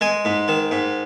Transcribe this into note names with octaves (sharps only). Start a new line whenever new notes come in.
G#3 G#5
G#2
D#3
G#2